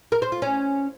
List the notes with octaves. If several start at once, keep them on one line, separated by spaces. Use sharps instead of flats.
A#4
C5
F4
C#4